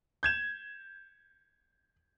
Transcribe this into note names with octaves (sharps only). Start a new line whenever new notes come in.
G6 G#6 E7